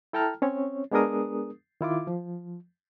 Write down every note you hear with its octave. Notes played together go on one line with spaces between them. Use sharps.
E4 A4 G5 A5 A#5 F6
C4 C#4 C#5
G#3 B3 D4 G#4 A#4 D#6
D#3 E4 F4 D6
F3